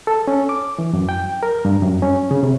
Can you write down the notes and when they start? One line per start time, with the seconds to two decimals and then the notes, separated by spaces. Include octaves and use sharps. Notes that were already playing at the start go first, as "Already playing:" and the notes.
0.07 A4
0.28 C#4
0.49 D6
0.79 E3
0.93 F#2
1.09 G5
1.43 A#4
1.65 G2
1.82 F#2
2.02 C#4
2.31 C#3
2.43 C3